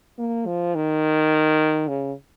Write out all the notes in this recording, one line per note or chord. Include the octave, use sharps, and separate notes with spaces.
A#3
F3
D#3
C#3